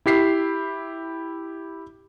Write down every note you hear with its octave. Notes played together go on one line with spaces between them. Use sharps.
E4 G4 B6 C7